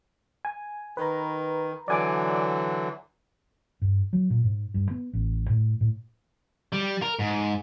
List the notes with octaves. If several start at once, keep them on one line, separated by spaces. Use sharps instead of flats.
G#5
D#3 B4 A#5
D3 E3 F#3 D5 G#5 D6
G2
F#3
A#2
G#2
G2
B3
A1
A2
A2
G3
A#4
G#2